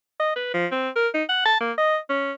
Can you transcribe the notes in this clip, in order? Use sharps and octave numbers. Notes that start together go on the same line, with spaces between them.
D#5
B4
F3
C4
A#4
D#4
F#5
A5
A#3
D#5
C#4